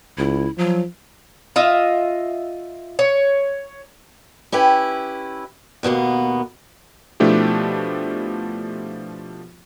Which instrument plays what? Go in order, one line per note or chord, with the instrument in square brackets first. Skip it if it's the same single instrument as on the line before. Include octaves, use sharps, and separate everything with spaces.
[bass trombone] C#2 [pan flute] E4
[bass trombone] F3 [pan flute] F#3
[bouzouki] F4 D#5 E5
C#5
[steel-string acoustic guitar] C#4 E4 G4 B4
D#2 B2 A#3 B3
[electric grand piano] B2 F3 A3 D4 E4 G4